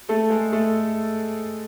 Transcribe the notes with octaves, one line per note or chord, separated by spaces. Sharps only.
A3 A4
G#3 G#4
A3 A4